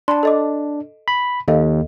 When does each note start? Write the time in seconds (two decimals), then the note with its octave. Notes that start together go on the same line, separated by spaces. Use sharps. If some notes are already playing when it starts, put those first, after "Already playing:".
0.08 D4 A5 B5 C6
0.23 A4 D#5 D6
1.08 B5
1.48 D#2 A4 D#5 F5